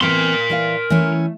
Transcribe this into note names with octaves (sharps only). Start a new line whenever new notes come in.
E3 C4 A#4 C6
E3 D5 F5
E3 A3 C#4